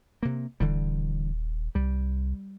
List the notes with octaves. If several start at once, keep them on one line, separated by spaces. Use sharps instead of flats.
C3 A#3
D#1 D3 E3 G3
C2 G3